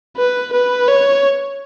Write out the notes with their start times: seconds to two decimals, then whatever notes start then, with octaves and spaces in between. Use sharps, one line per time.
0.17 B4
0.53 B4
0.88 C#5